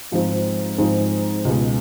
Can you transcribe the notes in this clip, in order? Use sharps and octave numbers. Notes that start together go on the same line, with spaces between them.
G#2 F3 G#3 C4 D#4
G#2 F3 G#3 C4 D#4
C#2 B2 G#3